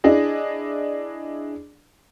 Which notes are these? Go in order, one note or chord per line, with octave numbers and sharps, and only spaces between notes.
D4 E4 G#4 D#5